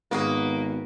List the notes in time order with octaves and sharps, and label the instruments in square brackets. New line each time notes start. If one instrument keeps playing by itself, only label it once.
[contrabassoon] G#1 [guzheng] G#2 F#4 G#4 [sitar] A#3 [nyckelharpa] B3